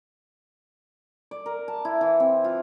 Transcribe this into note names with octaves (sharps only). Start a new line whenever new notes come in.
D5
A#4
A5
E4
E3
C4
F4